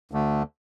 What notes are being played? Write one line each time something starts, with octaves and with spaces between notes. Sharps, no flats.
D2 D3 A3